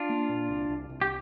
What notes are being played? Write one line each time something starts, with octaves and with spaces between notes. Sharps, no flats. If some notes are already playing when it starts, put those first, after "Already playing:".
Already playing: D4 F4
A#3
A#2
C2
C2
C2
G4